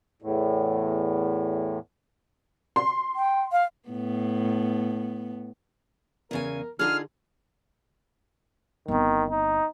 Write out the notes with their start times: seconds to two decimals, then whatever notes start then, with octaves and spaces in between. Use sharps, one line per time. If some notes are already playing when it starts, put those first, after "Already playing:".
0.22 E2 A2
2.76 C6
3.16 G5
3.52 F5
3.89 A2 B3
6.31 E2 C#3 A#4 G#5
6.79 D3 D#4 F4 G#4 F6
8.88 G1 D#3 C4
9.31 D#4